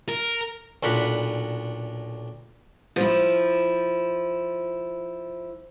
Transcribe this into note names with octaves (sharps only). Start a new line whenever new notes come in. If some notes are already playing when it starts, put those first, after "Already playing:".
A#4
B1 A#2 D4 F5 F#5 B5
F3 E4